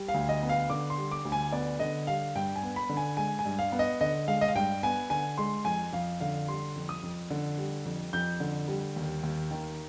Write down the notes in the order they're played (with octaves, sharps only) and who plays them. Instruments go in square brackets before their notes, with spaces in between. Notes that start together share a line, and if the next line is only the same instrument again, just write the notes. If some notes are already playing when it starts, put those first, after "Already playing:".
Already playing: [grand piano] G3
F5
D2
D#5
B3
F5
D3 D6
C6
G3
D6
D2
G#5
B3 D5
D3 D#5
G3 F5
G2 G5
G#5
B3
B5
D3
G#5
G#3 G#5
G#5
G2
F5
B3
D#5
D3 D#5
G#3 F5
D#5
F5
G2 G5
B3 G#5
D3 G#5
G#3 C6
F2 G#5
F2 F5
D3 F5
G3 C6
F2
D#6
F2
D3
G3
F2
F2 G6
D3
G3
D#2
D#2
D#3